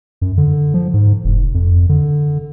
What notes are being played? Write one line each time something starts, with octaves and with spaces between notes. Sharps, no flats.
F#2
D3
F3
G#2
F1
F2
D3